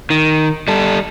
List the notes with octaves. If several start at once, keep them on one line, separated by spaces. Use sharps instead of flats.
D#3
G3 A4